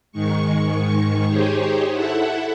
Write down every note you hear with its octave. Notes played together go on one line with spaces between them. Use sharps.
G#2 D#3 G#3 C#6
D#4 G4 G#4 C5 C#5
E4 A4 E5 F#5